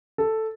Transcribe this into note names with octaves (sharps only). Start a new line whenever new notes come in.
A4